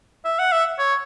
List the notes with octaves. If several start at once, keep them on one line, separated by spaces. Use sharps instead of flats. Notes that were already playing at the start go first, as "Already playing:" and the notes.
E5
F#5
E5
C#5